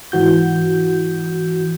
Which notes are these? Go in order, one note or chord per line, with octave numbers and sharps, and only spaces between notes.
G#2 E3 F#4 G6